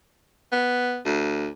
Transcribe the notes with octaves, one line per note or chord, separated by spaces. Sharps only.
B3
D2